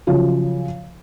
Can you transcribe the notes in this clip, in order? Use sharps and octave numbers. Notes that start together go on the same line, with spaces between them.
C#3 F3 F#3